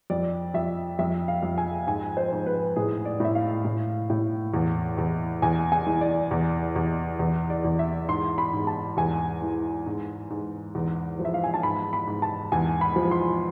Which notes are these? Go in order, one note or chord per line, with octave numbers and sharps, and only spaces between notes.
F2 D5
F2 E5
F2 E5
F5
F2
G#5
G#2 G#5
C5
G#2
B4
A2 G#4
D5
A2 E5
F5
A2
A2
E2
E2
E2 G#5
G#5
E3
D5
E2
E2
E2
D5
E2
E5
G#2 C6
B5
G#2
A5
E2 G#5
E3
G#2
G#2
E2
F3
E5
F5
G#5
A5
G#2 B5
B5
G#2
A5
E2 G#5
B5
F3
C6